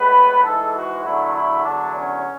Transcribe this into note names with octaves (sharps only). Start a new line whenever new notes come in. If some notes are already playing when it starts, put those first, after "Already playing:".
Already playing: A2 G#3 B3 B4
G#2 E3 G#3 A4
F#4
E2 D3 F#3 A3 E4
E4
E2 D3 F#3 D4
C#4